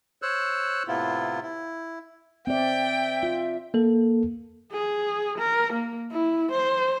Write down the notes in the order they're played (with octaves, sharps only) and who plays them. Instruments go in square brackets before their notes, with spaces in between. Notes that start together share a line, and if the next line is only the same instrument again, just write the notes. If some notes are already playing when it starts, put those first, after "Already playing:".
[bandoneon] C5 C#5 E6 F#6
A2 C3 B3 E4 F4
E4
[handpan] C4 D5 [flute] E5 [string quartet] G5
[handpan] F4
[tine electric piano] A#3 A4
[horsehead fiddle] G#4
A#4
A#3
E4
C5